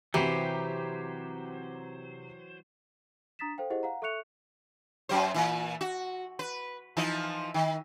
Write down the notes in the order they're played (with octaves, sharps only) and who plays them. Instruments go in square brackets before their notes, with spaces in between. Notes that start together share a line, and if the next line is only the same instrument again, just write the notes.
[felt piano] C3 F#4 A#5 [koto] E3 [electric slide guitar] F#3 C5 [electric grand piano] G4
[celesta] D4 A#5 D#6 A6 B6 E7
A4 C5 F5 G5
E4 G4 G#4 C5 D#5 F#5
F5 F#5 A#5
A4 E5 C#6 F#6 C#7 F7
[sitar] F#2 F#3 C5
A#2 E3
F#4
B4
E3 F3 D#4
D#3